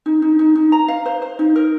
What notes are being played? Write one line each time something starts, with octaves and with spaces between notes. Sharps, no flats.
D#4
D#4
D#4
D#4
A#5
F5
C5
C5
D#4
A#4